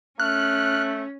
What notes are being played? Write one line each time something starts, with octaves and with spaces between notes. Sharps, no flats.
A3 C#4 F6 F#6